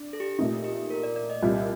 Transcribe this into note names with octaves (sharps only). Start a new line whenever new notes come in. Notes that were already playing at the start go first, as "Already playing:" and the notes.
Already playing: D4
A4
G4
A4
A#2 A3 D#4 G4
G4
A#4
D5
D5
D#5
C2 A#2 G3